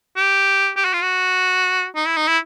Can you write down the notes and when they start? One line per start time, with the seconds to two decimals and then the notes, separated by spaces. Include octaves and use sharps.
0.16 G4
0.77 G4
0.85 F#4
0.93 F4
1.02 F#4
1.96 D#4
2.06 E4
2.17 D#4
2.27 E4